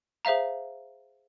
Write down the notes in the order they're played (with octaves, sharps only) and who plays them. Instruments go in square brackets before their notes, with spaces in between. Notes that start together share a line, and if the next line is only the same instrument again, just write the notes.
[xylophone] G#4 C5 E5 F5 A#5